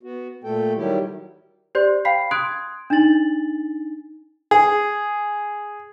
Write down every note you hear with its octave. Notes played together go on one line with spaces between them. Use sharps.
B3 F#4
A#2 A3 A4 G5
D#3 F#3 G3 E4 G4
G4 C5 D5 C6 G6
F5 G5 B5 B6 C7
C6 D#6 F#6 G#6 D7
D4 D#4 G#5 A6 F#7
G#4